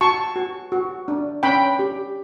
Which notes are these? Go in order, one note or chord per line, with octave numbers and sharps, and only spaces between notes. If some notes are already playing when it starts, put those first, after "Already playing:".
F#4 A5 C#6
F#4
F#4
D4
C#4 G5 B5
G4